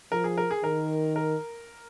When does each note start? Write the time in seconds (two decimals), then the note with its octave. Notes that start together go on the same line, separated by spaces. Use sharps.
0.12 F3 A#4
0.24 G#4
0.37 A#4
0.51 G#4
0.64 D#3 A#4
1.16 A#4